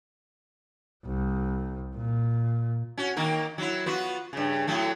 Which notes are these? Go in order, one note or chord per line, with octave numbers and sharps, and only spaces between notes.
C2
A#2
C#4 F#4
D#3 A#3 A#4
F#3 E4
B3 F4 F#4
G2 C#3
A2 F#3 A3